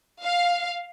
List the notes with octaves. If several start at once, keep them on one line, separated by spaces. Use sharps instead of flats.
F5